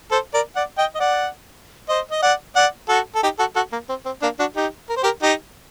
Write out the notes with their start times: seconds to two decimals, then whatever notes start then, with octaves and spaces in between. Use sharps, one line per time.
0.11 A4 C5
0.34 A#4 D5
0.56 D5 F#5
0.78 D#5 G5
0.95 D#5
1.00 D5 F#5
1.89 C5 D#5
2.11 D#5
2.22 D5 F#5
2.56 D5 F#5
2.89 F#4 A4
3.15 A4
3.23 D#4 G4
3.39 F#4 A4
3.55 F#4 A4
3.72 A#3
3.89 C4
4.06 C4
4.22 A#3 D4
4.39 D4 F#4
4.56 D#4 G4
4.89 A#4
4.97 C5
5.03 G4 A#4
5.23 D#4 G4